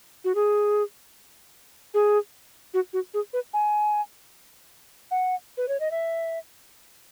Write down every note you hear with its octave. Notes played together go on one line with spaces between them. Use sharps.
F#4
G#4
G#4
F#4
F#4
G#4
B4
G#5
F#5
B4
C#5
D#5
E5